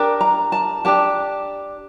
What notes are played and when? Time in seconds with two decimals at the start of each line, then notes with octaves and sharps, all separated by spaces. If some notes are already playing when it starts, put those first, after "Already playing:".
Already playing: D4 G4 A#4
0.21 A#5
0.52 A5
0.84 D4 G4 A#4 A5